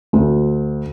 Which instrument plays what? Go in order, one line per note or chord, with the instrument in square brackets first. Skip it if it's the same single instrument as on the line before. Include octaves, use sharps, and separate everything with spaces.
[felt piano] D2